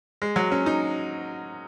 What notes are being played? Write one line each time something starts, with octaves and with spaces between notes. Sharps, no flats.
G#3
F#3
C#4
D#4